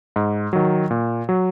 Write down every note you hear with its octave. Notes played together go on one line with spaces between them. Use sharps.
G#2
D#3 F#3
A#2
F#3